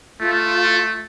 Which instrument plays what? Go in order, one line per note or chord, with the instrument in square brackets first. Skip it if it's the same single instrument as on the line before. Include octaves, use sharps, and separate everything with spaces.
[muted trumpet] A3 [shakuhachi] F4